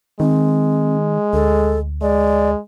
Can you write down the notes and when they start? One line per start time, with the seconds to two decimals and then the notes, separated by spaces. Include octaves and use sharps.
0.20 D#3 G#3 C4
1.33 D2 A4
2.02 G#3 D5